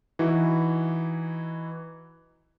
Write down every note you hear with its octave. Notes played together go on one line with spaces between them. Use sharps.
E3 D#4 E4 F#4